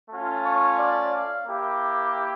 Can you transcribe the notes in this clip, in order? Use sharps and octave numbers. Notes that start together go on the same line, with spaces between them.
A3 C#4 F4
C#5
D5
F5
A#3 E4 G4